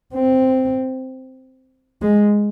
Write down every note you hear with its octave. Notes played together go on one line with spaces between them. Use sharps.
C4
G#3